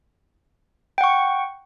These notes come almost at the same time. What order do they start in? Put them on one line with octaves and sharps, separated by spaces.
G5 F#5 C#6